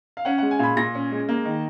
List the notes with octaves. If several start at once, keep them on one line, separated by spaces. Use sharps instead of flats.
F5
C#4 F#5
G#3 F#5
G#5
A#2 B5
A#2 A#6
C#4
G#3
A#3
D#3